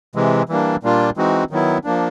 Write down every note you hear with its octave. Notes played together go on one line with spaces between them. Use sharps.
C3 E3 G#3
E3 G3 A#3 D4
A#2 G3 A#3 D4 F4
E3 G#3 C4 D#4 F#4
D#3 F#3 B3 E4
F3 A#3 D4